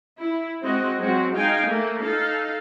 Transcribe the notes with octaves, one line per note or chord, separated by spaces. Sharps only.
E4
G#3 C4 F#4 D#5
F#3 G#3 C4 F#4
G#3 D#4 F5 G5 G#5
A3 A#3
D#4 A4 F5